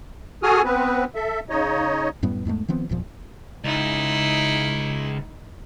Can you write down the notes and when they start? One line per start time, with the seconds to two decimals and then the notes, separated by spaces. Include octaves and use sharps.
0.43 F#4 G#4 A4 G#5 D#6 F6
0.64 B3 C4 B4
1.15 A4 E5
1.50 C#3 D#4 C#5 D#5
2.23 F#2 A2 G3 B3
2.45 E2 G#2 G#3 A3
2.68 D#3 F3 B3 C4
2.89 F#1 E2 A#2 F3
3.64 C#2 D#4 E4